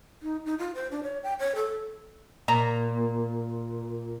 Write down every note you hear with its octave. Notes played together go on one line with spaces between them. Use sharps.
D#4
D#4
F4
C5
D4
C#5
G5
C#5
A4
A#2 A#5